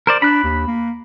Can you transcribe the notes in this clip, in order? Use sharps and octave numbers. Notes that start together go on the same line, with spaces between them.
A#4 C5 D5
D4 B5 F#6
D#2
A#3